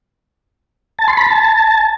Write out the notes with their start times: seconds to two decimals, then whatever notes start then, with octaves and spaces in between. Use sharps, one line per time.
0.99 A5
1.08 C6
1.17 B5
1.27 A5